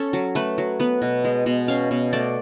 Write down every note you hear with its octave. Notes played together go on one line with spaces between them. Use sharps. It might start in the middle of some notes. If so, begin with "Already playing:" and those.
Already playing: C#4 A4
F#3
A3 B4
F#3
B3 B4
B2
G#3
B2
C#4 F5
B2
A3 D5